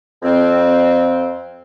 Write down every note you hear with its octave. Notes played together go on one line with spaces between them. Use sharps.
F2 C4